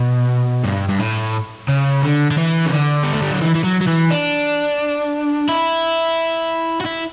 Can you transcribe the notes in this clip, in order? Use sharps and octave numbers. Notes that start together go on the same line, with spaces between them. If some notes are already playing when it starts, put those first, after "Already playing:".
Already playing: B2
G2
G2
A2
C#3
D3
D3
E3
C#3
D3
B3
A3
G3
F#3
E3
E3
F#3
F#3
E3
D4
E4
F#4
E4